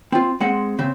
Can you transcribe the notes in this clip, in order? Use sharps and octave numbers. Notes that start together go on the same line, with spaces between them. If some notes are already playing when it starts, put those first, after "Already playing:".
C4 F4
G#3 C4 F#5
C#3 C4